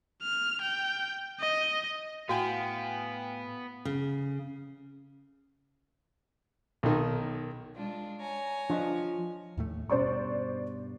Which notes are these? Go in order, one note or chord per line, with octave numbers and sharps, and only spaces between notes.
F6
G5
D#5
A2 B3 F#4 F5 G5 G#5
C#3
B1 D#3
G#3 D4 F4
C#5 G#5 A#5
F3 D4 D#5
D#2 A2 A3
G2 B2 C5 D5 C#6